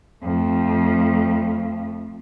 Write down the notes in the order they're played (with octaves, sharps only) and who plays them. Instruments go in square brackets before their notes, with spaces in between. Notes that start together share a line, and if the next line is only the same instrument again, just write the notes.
[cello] F2 A3